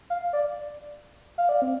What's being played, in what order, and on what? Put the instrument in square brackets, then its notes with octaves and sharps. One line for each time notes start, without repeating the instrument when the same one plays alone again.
[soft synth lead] F5
D5
F5
D5
C4